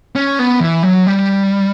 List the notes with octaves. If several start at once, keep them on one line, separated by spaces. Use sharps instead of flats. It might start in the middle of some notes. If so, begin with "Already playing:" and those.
C#4
B3
E3
F#3
G3